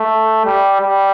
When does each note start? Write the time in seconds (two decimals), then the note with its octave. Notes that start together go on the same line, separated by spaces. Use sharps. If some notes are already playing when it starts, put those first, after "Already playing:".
Already playing: A3
0.45 G3
0.80 G3